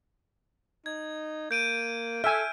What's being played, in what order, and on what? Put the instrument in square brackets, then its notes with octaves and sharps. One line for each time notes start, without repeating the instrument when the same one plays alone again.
[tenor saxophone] D#4 [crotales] G#6
[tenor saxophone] A#3 [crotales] G6 D7 D#7
[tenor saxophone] A4 [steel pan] E5 G#5 [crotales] F6